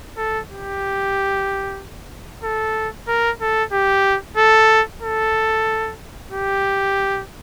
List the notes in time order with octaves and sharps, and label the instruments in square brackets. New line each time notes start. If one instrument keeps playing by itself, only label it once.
[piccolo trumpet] A4
G4
A4
A#4
A4
G4
A4
A4
G4